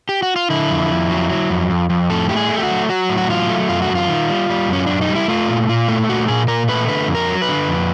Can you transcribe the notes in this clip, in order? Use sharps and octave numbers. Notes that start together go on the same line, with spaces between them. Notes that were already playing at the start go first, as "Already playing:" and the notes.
G4
F#4
F4
D3 E4
F2
F2
F#3
F#3
F2
F2
F2
A2 A4
A3 G4
G#4
A3
G4
F#4
F#3
F#3 F#4
A2
F#4
F#3 F4
A3
F#2 F4
F#4
F#2
F4
D#3
G3
G3
F#2 C#4
F#2 D4
D#4
G3
E4
A3 F4
A#2
A#2 F4
A3
A#2 F#4
A#2 G#4
A#2 A#4
A3 B4
D3 B4
F2
A#4
F#3
B4
D3
F2